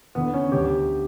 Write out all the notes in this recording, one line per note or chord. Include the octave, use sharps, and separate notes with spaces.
E2 D3 B3
C#4
D2 D3 G4